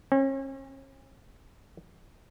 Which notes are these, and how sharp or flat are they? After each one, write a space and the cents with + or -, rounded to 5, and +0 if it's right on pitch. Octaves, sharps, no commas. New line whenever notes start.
C#4 -40